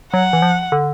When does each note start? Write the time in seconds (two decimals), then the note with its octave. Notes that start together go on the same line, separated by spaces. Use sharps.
0.13 F#3 F#5
0.33 E3
0.42 F3
0.72 D3